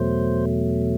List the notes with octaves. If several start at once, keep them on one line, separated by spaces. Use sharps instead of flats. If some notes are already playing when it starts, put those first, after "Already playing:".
Already playing: E2 B2 F#3 A3 C5